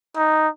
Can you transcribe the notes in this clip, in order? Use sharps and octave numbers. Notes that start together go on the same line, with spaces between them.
D#4